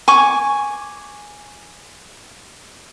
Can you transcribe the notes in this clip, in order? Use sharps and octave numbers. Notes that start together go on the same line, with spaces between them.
G#5 C#6 D6